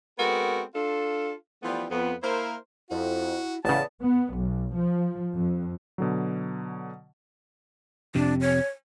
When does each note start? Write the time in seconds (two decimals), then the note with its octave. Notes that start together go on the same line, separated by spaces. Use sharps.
0.18 G#3 B3 C4 F#4 A4 A#4
0.74 D4 F4 A4
1.62 E3 F3 G3 A3 B3
1.89 F2 F3 B3
2.23 A#3 E4 A#4 C5
2.90 F2 E4 F#4
3.65 A1 C#3 E3 B3 D5 A5
4.02 B3
4.35 B1
4.77 F3
5.33 F2
5.98 B2 D3 F#3
8.15 F2 C3 D4
8.41 C#5